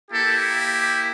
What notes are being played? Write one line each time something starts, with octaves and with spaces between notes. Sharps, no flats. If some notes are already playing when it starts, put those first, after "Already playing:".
A#3 E4 G4 A4